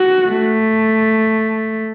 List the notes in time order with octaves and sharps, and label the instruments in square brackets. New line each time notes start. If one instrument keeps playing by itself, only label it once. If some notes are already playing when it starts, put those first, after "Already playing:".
Already playing: [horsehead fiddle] F#4
[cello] A3